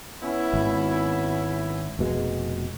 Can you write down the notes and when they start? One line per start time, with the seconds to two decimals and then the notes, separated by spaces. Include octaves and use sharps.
0.23 B3 C#4 E4
0.53 G#1
1.99 F1 B2 G#3